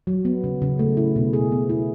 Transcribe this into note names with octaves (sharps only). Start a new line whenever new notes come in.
F#3
B3
C#3
C#3
A3
E4
B2
G#4
B3
E4